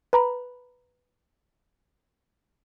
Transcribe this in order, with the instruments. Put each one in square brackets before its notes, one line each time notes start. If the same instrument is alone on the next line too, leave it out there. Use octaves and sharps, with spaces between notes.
[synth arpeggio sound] B4 A#5 B5